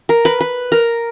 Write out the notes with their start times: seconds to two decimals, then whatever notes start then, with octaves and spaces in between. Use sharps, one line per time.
0.09 A#4
0.25 B4
0.41 B4
0.72 A#4